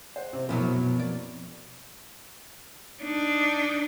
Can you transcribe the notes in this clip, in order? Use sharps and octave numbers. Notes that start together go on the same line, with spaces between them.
C5 F#5
C3 C5
F#2 B2 F3 F#3 B3 E4 A#4
A#3 C4 D5
D4 D#4